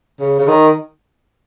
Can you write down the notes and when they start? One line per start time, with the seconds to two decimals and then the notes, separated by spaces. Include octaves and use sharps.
0.21 C#3
0.39 C#3
0.48 D#3